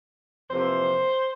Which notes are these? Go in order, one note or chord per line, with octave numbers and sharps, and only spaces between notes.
F2 C3 E3 A#3 C5